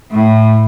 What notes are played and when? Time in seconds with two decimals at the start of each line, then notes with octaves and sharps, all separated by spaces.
0.12 A2